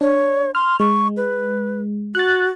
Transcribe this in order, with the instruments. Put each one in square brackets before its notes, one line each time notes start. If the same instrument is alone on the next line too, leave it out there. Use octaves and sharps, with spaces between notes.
[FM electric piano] D4 [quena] C#5
[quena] C6 [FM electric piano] F6
[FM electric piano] G#3 [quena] C#6
[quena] B4
[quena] F#4 [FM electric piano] F#6 A6